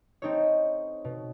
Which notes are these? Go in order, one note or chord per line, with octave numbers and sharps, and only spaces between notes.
C4 D#4 A4 C#5
B2